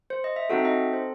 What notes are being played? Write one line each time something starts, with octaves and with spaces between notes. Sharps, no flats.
C5
D#5
E5
C4 D#4 F#4 A4 F#5
E5
D#4 D#5
C5